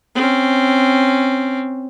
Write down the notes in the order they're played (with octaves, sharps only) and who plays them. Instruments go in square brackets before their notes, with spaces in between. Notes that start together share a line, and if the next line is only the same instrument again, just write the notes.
[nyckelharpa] C4 C#4